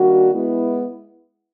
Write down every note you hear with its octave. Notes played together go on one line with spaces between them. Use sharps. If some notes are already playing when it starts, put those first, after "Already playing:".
Already playing: D#3 G3 A#3 D4 F#4
G#3 B3 E4